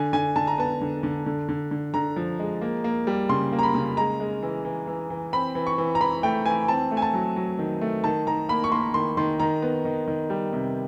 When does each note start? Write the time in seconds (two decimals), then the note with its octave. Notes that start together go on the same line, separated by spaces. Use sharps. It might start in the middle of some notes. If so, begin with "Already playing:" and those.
Already playing: D3 G#5
0.13 D3 G#5
0.36 D3 A5
0.47 A#5
0.58 B3 A5
0.81 D3
1.03 D3
1.26 D3
1.49 D3
1.71 D3
1.94 D3 A#5
2.16 F3
2.39 G#3
2.61 A#3
2.84 A#3
3.07 G3
3.29 C#3 C6
3.52 A#3
3.59 A#5
3.63 B5
3.75 C#3
3.97 G#3 A#5
4.20 G#3
4.43 E3
4.65 E3
4.87 E3
5.10 E3
5.33 C4 B5
5.55 E3
5.67 C#6
5.78 E3
5.95 A#5
6.01 E3 B5
6.23 A3 G5
6.46 E3 G#5
6.68 C4 A5
6.91 A3
6.97 G#5
7.02 A5
7.14 F#3
7.36 F#3
7.59 D#3
7.81 A3
8.04 D#3 A5
8.27 D#3 A#5
8.49 A#3 B5
8.64 C#6
8.72 A#3 C6
8.94 D#3 C6
9.17 D#3 C6
9.40 D#3 A#5
9.62 B3
9.85 D#3
10.07 D#3
10.30 G3
10.53 C3